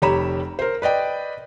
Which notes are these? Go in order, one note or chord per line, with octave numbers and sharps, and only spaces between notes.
F1 G4 C#5 A#5 B5 E7
A#4 C5
B4 D5 D#5 G5